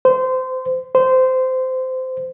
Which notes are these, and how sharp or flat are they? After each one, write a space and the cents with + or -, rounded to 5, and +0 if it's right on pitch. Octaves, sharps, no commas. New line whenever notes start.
C5 -25
C5 -20